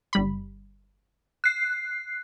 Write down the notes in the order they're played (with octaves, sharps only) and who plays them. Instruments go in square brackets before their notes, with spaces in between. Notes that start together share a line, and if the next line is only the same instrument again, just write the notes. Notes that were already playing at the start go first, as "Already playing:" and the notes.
[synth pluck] G1 G3 B5
[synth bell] F#6 C7